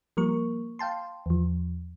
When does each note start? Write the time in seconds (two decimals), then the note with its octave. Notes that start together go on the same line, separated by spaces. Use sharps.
0.17 F3 G3 A#3 A#4 C#6
0.79 F5 G5 A5 C6
1.26 E2 F3